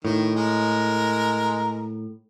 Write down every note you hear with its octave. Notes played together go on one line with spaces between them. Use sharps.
A2 D#3
G#3 A#4